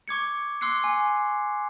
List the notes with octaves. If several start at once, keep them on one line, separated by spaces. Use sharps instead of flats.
C#6 D6 G#6 C#7
C6 D6 E6 F#6 C7 C#7
G#5